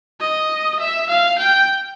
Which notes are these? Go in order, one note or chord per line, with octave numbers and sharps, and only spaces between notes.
D#5
E5
F5
G5